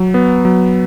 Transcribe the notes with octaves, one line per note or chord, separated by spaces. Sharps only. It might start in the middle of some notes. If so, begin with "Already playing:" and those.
Already playing: F#3
B3
F#3